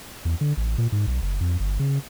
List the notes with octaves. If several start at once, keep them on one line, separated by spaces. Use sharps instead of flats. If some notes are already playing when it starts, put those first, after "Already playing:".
E2
D3
A1
A#2
G#2
B1
F#1
F2
G1
C#3